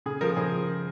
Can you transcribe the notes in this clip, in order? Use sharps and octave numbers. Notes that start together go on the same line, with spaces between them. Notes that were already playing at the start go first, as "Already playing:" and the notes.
C#3 G#4
F3 A#4
C#3 G#4 C5